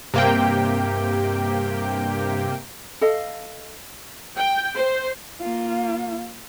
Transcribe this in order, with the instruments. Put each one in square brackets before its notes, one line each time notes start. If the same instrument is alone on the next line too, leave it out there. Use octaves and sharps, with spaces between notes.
[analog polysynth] G2 G4 [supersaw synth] C3 A#3 G5
[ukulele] A4 D#5 F5
[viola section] G5
C5
[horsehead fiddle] A#3 F4